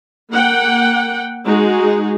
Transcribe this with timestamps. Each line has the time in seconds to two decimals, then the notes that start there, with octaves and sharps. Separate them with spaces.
0.31 A#3 F#5 G5
1.44 G#3 D#4 F#4 G#4